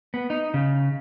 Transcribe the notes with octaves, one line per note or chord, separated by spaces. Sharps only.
B3
D#4
C#3